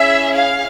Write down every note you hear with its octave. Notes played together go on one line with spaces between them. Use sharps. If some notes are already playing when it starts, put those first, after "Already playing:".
Already playing: C#4 E4 G#4 E5
F5